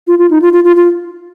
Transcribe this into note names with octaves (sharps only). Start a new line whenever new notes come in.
F4
F4
D#4
F4
F4
F4
F4